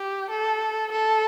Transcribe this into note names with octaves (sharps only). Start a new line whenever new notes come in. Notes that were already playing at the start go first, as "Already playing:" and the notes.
Already playing: G4
A4
A4